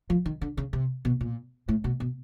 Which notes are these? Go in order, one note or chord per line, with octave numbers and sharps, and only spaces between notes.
F3
D#3
D3
C#3
C3
B2
A#2
A2
B2
B2